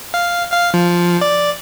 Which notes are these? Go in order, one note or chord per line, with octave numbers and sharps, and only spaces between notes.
F5
F5
F3
D5